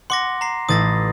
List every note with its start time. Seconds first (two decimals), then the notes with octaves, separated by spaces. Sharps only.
0.10 F#5 C6 D6 A#6
0.41 A#5 C7
0.69 A1 E4 D#6 A6 A#6